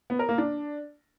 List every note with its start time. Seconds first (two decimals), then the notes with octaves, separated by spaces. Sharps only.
0.10 B3
0.19 A#4
0.29 A#3
0.38 D4